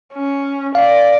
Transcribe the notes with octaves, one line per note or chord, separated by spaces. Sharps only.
C#4
D5 F5